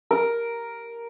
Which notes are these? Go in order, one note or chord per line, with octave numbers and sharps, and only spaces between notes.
A#4